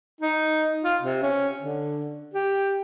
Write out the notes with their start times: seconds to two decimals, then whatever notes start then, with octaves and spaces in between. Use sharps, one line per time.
0.20 D#4
0.84 F4
1.01 C3
1.23 C#4
1.59 D3
2.34 G4